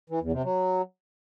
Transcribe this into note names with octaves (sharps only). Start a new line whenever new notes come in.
E3
E2
C3
F#3